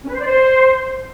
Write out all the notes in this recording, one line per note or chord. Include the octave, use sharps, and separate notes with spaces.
C#4
B4
C5
D5
C5